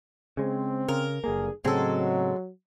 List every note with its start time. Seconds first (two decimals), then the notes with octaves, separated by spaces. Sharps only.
0.37 C#3 G#3 C4
0.88 C#3 A#4
1.24 F#1 G2 D3 A#3 G#4
1.65 A2 C#3 F#3 G#3 C4 A4